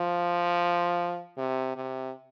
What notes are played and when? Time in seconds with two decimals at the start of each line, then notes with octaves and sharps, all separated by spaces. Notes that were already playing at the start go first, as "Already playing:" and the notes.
Already playing: F3
1.38 C3
1.76 C3